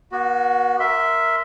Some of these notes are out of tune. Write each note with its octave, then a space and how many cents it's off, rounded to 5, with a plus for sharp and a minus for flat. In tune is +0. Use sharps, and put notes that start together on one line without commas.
B3 -45 F#4 +5
A#4 +0 E5 +0 C6 -15